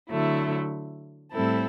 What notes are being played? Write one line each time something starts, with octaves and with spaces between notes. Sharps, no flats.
D3 F#3 A3 E4
A2 G3 C4 E4 A4